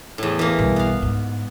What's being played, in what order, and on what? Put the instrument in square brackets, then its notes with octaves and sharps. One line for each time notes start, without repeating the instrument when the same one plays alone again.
[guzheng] E2 A2
E3 A#3
[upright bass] B1 G2
[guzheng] B3 F5
[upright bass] G#2